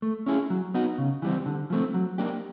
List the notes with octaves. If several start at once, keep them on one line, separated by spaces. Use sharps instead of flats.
A3
C#4 E4 G#4
F#3
B3 D#4 F#4
C#3
E3 G3 C4
D3
F3 A3 C4
F#3
A#3 D4 G4